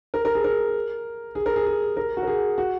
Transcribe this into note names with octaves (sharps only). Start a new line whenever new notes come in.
A#4
A#4
G#4
A#4
G#4
A#4
G#4
G#4
A#4
F#4
A#4
G#4
F#4